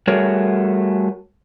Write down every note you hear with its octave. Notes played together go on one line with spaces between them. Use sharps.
G3 A3 F#4 G#4 A#4 C#5